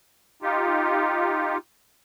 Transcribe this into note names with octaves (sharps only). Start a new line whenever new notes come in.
D#4 F4 G4